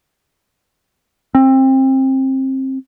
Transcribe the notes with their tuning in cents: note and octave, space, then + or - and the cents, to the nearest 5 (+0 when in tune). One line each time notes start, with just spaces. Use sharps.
C4 +25